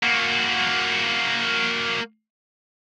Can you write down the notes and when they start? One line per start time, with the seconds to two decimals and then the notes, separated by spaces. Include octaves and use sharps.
0.03 A#3 F#4